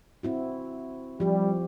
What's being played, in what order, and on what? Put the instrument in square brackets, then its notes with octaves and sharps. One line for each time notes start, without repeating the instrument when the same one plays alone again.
[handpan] C4 E4 F#4
[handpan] F3 G4 [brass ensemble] G3